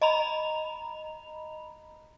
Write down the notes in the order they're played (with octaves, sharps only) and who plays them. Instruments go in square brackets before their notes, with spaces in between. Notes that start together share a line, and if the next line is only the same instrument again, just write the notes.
[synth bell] D#5 A#5 B5 F7